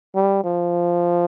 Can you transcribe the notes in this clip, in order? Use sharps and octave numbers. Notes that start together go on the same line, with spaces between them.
G3
F3